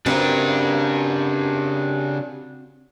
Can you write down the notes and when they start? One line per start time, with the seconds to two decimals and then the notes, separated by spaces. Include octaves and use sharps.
0.06 C#3 C4 D4 F#4 G4 A#4 B4